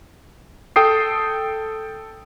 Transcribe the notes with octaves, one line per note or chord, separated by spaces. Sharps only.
A4 G5 D#6 C7